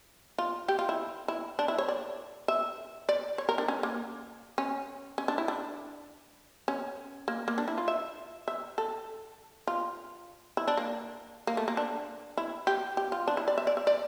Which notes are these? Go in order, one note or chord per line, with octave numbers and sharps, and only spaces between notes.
F4
G4
F4
E4
E4
D4
E4
C#5
D5
E5
D5
C#5
A#4
D4
C#4
A#3
C#4
C#4
D4
E4
D4
C#4
A#3
A#3
D4
E4
F4
E5
E5
A4
F4
E4
D4
A#3
A#3
A3
A#3
D4
E4
G4
G4
F4
D4
E4
D5
E5
D5
E5
D5